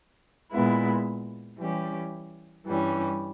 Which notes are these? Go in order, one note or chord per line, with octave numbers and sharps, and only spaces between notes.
A#2 G#3 B3 E4
E3 G3 C#4 G4
G2 E3 G3 C#4